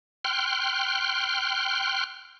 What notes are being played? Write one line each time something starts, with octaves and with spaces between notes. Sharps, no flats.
G5 C6 F6 F#6